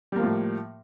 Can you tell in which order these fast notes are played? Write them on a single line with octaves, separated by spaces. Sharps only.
G3 A#3 F3 A2